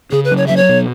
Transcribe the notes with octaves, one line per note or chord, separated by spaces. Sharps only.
C#3 G#4
B4
F#3
C#5
F#3 E5
C#5
B2